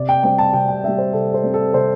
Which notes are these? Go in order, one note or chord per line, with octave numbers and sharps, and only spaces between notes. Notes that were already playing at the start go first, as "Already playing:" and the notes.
Already playing: C3 D5
G5
G3 C4 G5
A5
C3 G5
G5
G3 C4 E5
C5
C3 A4
C5
G3 C4
A4
C3 C5